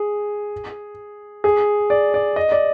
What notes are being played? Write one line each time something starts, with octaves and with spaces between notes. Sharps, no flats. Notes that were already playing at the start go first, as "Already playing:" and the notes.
Already playing: G#4
G#4
D5
D5
D#5
D5